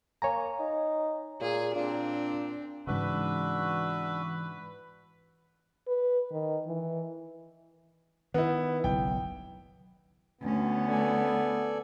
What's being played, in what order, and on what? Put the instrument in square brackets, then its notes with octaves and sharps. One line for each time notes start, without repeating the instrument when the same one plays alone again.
[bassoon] A#3 [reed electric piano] C#5 G#5 A#5
[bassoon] D#4
[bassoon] A#2 [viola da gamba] G#4
[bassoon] A#2 [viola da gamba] C4 D4
[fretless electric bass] G#2 C#3 [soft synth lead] E3 [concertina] D4 F#4 E5 [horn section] B4
[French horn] B4
D#3
E3
[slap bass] D#3 [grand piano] B3 E4
[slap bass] F#1 B1 [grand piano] G5
[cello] D2 C#4 [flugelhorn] B3
[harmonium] A4 D5 G#5